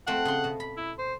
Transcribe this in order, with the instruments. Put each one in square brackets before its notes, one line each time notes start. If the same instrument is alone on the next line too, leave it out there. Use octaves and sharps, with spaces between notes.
[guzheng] F3 A3 C4 [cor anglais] F#5
[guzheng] C#3 C6
B2
B5
[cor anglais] E4
C5